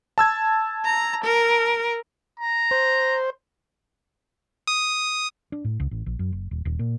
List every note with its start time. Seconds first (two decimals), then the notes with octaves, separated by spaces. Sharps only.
0.18 A5 E6 G#6
0.85 A#5
1.25 A#4
2.40 A#5
2.71 C5
4.67 D#6
5.52 D4
5.65 A2
5.80 C#2
5.91 A1
6.06 A#1
6.19 F#2
6.32 F#1
6.51 D#1
6.65 D#1
6.79 A#2